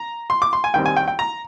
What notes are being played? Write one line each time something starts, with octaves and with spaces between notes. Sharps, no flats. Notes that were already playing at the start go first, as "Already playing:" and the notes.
Already playing: A#5
C6
D6
C6
G#5
D#2 D#3 G3 C4 G5
G#5
G5
G5
A#5